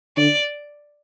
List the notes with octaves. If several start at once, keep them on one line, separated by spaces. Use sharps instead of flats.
D3 D5